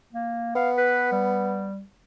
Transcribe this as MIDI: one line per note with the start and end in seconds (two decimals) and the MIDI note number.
0.13 0.55 58
0.56 1.67 59
0.56 0.70 77
0.77 1.08 71
1.12 1.82 55